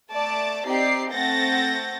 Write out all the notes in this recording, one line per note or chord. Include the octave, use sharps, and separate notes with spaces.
A3 D5 A5 D6
C4 D#4 G4 D5 C7
A3 C4 F#5 G6 A6 A#6